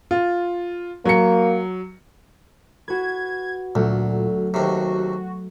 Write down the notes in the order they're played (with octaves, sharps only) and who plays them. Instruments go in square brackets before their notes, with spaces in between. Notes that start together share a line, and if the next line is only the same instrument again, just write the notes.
[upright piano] F4
[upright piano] F#3 C#7 [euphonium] A#3
[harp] F#4 B4 [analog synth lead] G#6
[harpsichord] D2 [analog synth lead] A#2 [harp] F#3 A3
[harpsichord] D#2 C3 [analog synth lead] F#4